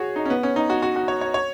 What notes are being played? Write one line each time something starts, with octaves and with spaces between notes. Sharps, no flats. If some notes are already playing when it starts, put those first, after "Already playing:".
Already playing: F#4 G#4 C#5
D#4
C#4
B3
C#4
D#4
F#4
F#4
F#4
C#5
C#5
C#5